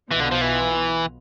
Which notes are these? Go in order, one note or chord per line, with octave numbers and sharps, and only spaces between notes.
B1 B2 E3 B3 F4
D3
F3
E3